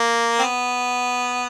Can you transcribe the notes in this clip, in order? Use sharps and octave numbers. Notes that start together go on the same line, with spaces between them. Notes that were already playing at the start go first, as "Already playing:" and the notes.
Already playing: A#3
C4
B3